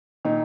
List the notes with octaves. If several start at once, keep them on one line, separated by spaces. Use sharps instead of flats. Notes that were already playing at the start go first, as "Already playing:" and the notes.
A#2 D#3 D#4